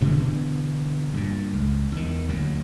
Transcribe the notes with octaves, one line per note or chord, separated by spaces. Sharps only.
G2 B2 D3 E3
G2 A#2
C#2
E2 D#3
D2 A#2 F#3